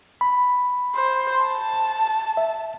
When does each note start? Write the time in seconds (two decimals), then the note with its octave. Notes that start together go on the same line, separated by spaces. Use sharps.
0.21 B5
0.95 C5
1.45 A5
2.37 E5